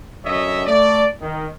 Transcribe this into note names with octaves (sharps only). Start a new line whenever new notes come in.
F#2 D3 C#5 D#5 E5
A3 D5
D#3